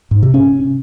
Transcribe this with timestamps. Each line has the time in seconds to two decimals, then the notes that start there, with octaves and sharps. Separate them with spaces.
0.11 G#2
0.23 C3
0.34 C#4